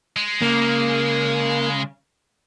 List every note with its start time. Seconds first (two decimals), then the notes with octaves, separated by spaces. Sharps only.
0.17 G#3
0.42 C#3 A#3